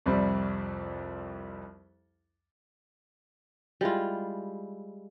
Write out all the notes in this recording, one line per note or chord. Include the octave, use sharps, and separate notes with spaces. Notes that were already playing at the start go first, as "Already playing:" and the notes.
C2 F2 G3 C4
G3 G#3 E4 F4